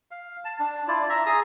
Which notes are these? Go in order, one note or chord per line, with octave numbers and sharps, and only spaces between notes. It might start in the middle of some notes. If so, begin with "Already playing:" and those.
F5
A5
D4
E4 F4 D5
E5 A#5
G#4 A#5 D#6